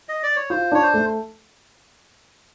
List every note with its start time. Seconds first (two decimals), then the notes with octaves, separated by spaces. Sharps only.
0.09 D#5
0.23 D5
0.36 C#5
0.50 F4 C5
0.72 D4 C#5
0.82 C5
0.94 A3